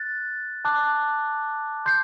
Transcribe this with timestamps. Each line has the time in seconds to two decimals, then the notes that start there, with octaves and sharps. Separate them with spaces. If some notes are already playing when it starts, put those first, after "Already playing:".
Already playing: F#6 A6
0.65 A5 D6 F#6
1.86 C6 G6 C7